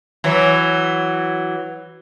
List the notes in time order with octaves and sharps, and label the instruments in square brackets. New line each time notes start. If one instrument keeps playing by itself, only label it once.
[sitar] E3 F#3